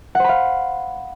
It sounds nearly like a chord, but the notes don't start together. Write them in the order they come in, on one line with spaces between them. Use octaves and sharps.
F#5 C5 B5 F5